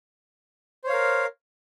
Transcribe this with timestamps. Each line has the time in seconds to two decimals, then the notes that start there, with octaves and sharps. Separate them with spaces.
0.84 C5
0.87 C#5
0.90 F5
0.93 A#4